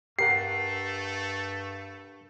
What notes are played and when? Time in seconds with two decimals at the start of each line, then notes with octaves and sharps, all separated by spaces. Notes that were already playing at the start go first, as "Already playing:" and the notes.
0.19 G2 A3 G4 A#4 F#5 C7